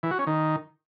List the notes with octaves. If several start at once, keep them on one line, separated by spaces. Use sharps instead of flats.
E3
F#4
C#4
D#3